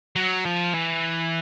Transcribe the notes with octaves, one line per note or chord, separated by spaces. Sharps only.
F#3
F3
E3